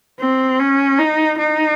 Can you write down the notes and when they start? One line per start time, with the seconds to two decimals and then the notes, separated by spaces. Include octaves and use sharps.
0.20 C4
0.60 C#4
0.99 D#4
1.38 D#4